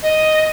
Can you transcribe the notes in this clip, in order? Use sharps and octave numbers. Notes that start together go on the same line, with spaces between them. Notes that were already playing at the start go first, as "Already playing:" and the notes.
D#5